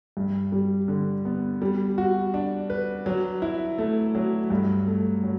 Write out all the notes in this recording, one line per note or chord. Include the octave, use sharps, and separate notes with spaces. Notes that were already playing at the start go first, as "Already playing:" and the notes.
G2
G3
D3
B3
G3
F#4
D4
B4
F#3
E4
A3
F#3
G2
A3
F#3